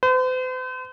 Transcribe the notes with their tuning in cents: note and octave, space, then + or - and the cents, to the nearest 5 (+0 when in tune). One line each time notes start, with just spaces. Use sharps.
C5 -45